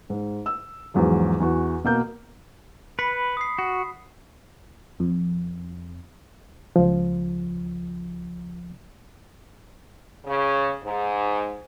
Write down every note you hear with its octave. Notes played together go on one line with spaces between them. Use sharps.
G#2
E6
E2 G#2 F3 F#3
E2 E3 F#4
B2 A#3 G6
B4 B5 B6 C#7
D#6 C7
F#4
F2
C#2 F3
C#3
G#2